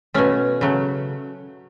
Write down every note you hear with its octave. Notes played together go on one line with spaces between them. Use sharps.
B2 A3 C#4
C#3 F#3 A3